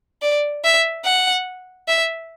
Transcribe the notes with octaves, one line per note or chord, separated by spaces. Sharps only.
D5
E5
F#5
E5